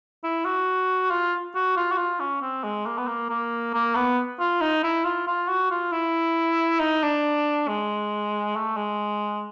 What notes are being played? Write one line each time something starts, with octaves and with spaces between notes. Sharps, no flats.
E4
F#4
F4
F#4
F4
F#4
F4
C#4
C4
G#3
A#3
B3
A#3
A#3
A#3
B3
F4
D#4
E4
F4
F4
F#4
F4
E4
D#4
D4
G#3
A3
G#3